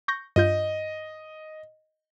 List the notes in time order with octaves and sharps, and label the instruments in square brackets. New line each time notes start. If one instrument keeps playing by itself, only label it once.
[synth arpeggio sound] C#6 G6 A#6
[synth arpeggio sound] G2 F4 G6 [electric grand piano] D#5